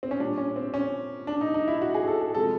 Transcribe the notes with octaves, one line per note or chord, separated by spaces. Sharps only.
C4
C#4
A#2 G3 D4
C#4
C4
C#4
D4
D#4
D#4
E4
F#4
G#4
A4
G#4
C3 F3 G#3 A4